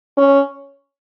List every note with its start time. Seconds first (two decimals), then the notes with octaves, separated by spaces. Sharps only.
0.17 C#4